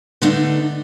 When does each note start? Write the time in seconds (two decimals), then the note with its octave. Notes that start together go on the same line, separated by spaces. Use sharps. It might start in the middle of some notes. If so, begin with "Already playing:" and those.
0.22 D3 A3 B3 D4 D#4